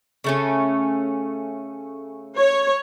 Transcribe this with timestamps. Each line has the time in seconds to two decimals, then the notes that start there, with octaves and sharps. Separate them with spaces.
0.24 C#3 A3 C#4
2.37 C#5